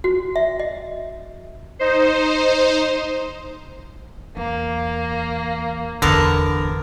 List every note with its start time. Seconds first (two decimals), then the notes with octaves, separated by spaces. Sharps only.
0.04 F#4
0.36 E5
0.60 D#5
1.79 D#4 C5
4.37 E2 A#3
6.02 G1 E2 D3 B3 A#4 A5